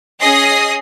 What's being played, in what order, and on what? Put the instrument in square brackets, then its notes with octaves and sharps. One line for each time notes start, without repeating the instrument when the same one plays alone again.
[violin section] C#4 G#4 D#5 D#6 A#6 C7